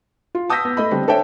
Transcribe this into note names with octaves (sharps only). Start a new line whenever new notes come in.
F4
A5 D#6 E6 G6 A#6 B6
B3
A3 D#5 B5
D3 G3 C4 D4
D4 A4 C5 C#5 E5 G5